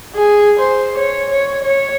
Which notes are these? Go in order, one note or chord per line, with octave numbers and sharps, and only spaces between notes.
G#4
C5
C#5
C#5
C#5